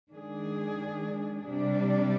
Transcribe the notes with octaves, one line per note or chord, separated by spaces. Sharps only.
D#3 G#3 D4 G#4
C3 G3 D4